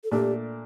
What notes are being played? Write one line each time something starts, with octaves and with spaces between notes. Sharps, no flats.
A4
A#2 A3 D4 G4